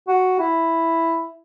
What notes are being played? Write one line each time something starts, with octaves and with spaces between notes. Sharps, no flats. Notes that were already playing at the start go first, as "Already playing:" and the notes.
F#4
E4